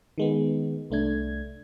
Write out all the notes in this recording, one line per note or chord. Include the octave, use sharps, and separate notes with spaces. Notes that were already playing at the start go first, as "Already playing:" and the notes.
D#3 G#3 B3
C2 A3 D4 G#6